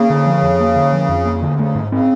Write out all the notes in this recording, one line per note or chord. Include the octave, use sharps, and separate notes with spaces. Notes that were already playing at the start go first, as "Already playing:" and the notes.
Already playing: C#3 A#3
D3
F3
F2
A#3
D3
F3
F2
A#3
A#2
B2 D3
C3
C#3 A3
G#2
C#3 C4